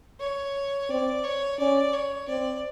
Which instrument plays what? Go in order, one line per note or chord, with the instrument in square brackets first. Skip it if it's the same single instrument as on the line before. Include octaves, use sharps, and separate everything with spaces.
[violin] C#5
[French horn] C4 [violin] D5
[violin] C#5
[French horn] C#4 [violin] D5
[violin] C#5
[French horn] C4 [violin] D5